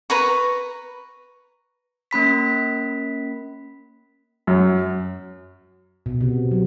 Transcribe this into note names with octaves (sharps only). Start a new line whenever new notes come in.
B4 A#5 C#6
A#3 C#4 B5 B6
F#2
B2
C3
F#3